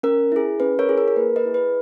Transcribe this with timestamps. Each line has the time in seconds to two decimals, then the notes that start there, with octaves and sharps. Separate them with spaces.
0.03 C#4 A#4
0.32 E4 G#4
0.60 C#4 B4
0.79 A#4 C#5
0.88 E4 G#4
0.98 A#4
1.08 A#4
1.16 A#3 B4
1.36 B4 D#5
1.46 E4 G#4
1.54 B4